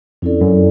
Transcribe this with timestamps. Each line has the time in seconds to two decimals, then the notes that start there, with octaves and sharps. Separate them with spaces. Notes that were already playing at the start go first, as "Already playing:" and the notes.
0.22 F2 C#4 E4 A4 D5
0.41 F#2